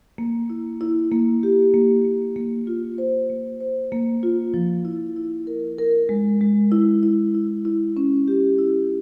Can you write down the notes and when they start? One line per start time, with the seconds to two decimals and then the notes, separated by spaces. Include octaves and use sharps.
0.18 A#3
0.50 E4
0.81 E4
1.12 A#3
1.43 G4
1.74 A#3
2.05 A#3
2.36 A#3
2.67 F4
2.98 C5
3.30 A#3
3.60 C5
3.92 A#3
4.23 F4
4.54 F3
4.85 E4
5.16 E4
5.47 A#4
5.79 A#4
6.09 G#3
6.41 G#3
6.72 E4
7.03 E4
7.34 E4
7.65 E4
7.97 C#4
8.28 G4
8.58 E4